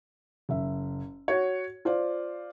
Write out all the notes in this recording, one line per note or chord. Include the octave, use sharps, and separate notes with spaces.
F#1 E5
F#4 C#5
F4 C5 D5